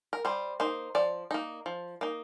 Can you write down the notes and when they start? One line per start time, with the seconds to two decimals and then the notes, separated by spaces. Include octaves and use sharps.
0.13 A#4
0.25 G3 C5
0.60 A#3 D#4 C5
0.95 F3 D5
1.31 A#3 D#4
1.66 F3
2.01 A#3 D#4